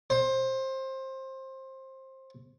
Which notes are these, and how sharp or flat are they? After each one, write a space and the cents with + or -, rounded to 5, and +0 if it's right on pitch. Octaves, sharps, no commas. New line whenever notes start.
C5 +20